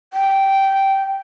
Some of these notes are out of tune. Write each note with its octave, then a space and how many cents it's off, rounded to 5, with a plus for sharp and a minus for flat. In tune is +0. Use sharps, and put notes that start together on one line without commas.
G5 -10